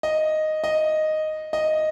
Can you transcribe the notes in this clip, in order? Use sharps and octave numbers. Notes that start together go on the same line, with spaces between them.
D#5
D#5
D#5